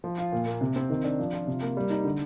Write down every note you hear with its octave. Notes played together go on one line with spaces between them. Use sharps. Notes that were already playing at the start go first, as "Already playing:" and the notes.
F3
F4
A#2
A#3
C3
C4
D#3
D4
F3
F4
C3
A#3
G3
D#4
D3